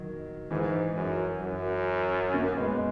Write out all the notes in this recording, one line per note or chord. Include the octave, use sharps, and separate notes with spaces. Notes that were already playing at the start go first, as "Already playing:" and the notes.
Already playing: D#3 F#3
G#2 E3
F#2
F#2
A#3 C#4
G#3 B3